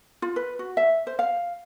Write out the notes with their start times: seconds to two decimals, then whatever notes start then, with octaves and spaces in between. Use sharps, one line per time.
0.22 F4
0.36 B4
0.59 F#4
0.77 E5
1.07 C5
1.19 F5